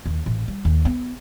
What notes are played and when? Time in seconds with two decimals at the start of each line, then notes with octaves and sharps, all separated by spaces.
0.06 D#2
0.26 A1
0.48 G3
0.65 D#2
0.85 B3